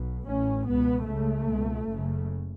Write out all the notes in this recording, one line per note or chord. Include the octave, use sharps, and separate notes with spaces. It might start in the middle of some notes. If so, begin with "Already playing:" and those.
Already playing: B1 B2
A1 A2 C#4
C#2 B2 B3
C#2 C#3 A3
C#2 B2
F#1 F#2 C#3